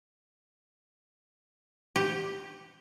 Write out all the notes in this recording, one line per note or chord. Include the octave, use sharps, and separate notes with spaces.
G4